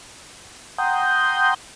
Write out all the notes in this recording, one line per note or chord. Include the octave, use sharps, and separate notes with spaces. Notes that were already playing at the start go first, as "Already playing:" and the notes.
F#5 G5 A#5 C6 D#6 G6